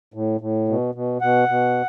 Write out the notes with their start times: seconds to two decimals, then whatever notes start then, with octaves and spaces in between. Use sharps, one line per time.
0.14 A2
0.41 A2
0.68 B2
0.95 B2
1.21 B2 F#5
1.49 B2